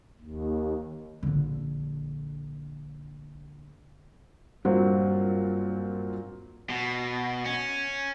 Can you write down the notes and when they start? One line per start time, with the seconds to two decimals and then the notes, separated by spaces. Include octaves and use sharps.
0.21 D#2
1.23 A#1 D3
4.65 G2 A#2 F#3 C4
6.70 B2
7.45 C#4